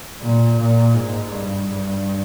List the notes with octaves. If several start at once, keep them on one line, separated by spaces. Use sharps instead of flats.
A#2
A#2
G#2
G2
G2